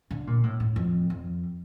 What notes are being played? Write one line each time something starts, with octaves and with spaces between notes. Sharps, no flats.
D3
A#2
A2
A2
F2
F2